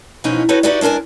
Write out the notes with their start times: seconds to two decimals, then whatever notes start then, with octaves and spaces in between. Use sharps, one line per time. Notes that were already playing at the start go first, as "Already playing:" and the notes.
0.24 G#2 B2 E3 F3 C#4 D#4
0.49 C4 D#4 F#4 A4 B4 C#5
0.63 D#4 E4 F#4 G4 B4 D5
0.81 G#3 D4 A#4 G#5 A5